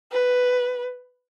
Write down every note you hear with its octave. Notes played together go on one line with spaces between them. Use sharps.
B4